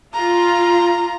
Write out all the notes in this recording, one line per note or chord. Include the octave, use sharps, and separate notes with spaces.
F4 A#5